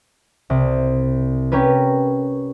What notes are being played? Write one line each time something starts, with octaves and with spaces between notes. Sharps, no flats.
C2
C#4 G4 A#4 B4